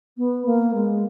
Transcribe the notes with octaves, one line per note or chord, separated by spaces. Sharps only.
B3
A#3
G#3